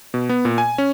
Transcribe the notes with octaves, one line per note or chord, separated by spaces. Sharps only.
B2
B3
A#2
G#5
C#4